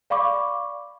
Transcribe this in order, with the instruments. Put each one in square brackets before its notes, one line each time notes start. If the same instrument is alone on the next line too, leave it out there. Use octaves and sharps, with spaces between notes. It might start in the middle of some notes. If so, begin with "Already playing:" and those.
[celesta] D5 F5 B5 C#6 D6